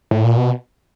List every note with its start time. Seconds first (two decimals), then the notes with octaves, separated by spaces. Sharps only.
0.11 A2
0.24 A#2
0.37 B2